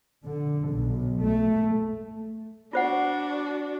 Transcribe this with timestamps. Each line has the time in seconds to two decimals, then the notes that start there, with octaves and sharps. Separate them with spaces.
0.23 D3
0.70 B1
1.19 A3
2.73 D4 F4 F#4 C5 F#5